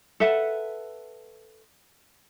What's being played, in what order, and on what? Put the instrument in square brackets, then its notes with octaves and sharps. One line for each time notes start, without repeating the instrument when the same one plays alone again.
[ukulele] A4 B4 E5 F#5